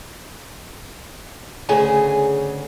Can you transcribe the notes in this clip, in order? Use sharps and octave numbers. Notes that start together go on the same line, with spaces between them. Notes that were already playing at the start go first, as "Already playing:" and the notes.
D2 C#3 G#4 G#5